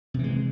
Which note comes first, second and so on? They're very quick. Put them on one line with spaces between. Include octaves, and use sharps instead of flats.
C3 E3 G#3